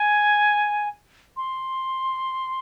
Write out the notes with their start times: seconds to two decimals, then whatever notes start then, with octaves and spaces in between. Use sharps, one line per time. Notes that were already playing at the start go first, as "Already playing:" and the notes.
Already playing: G#5
1.36 C6